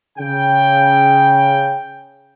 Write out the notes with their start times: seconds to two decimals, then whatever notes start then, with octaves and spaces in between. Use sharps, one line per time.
0.18 C#3 G5